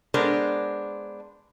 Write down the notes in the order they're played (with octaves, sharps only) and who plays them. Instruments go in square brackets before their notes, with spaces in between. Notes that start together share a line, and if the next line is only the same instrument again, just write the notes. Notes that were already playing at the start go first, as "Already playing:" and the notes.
[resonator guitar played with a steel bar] G#3 B3 D4 A#4 C5 D5